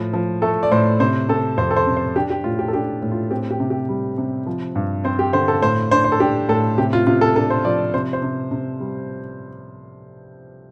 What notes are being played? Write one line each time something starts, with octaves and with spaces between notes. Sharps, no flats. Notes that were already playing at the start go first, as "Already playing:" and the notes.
Already playing: A2 F3
F3
A3 A4
D5
A2 C5
C3 C5
C3 A4
F2 C5
A4
C5
C3
C5
D4 G4
G4
A2 F4
G4
A4
D4 G4
A2
F4
C4 G4
G4
C3
G4
G3
C3
F3
G2
C4 C5
G4
D3 C5
A4
A2 C5
D4 C5
C5
A4
D4 G4
A2 A4
C3 G4
F4
C3 F4
A4
D4 A4
C5
F3 D5
C3 C5
C5
C3
C3
G3